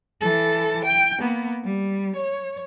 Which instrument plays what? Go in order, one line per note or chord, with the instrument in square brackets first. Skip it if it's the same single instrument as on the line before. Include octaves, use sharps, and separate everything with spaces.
[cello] E3 A4
G5
A#3 B3
G3
C#5